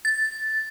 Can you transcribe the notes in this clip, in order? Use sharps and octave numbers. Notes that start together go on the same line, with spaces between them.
A6